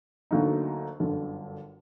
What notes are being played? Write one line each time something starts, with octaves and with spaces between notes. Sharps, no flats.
D2 D3 F#3 A#3 D#4
G1 F#2 D3